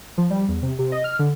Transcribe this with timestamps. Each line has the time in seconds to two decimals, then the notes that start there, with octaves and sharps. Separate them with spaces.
0.18 F3
0.30 G3
0.48 E2
0.62 C3
0.79 C3
0.92 D#5
1.04 F6
1.19 D3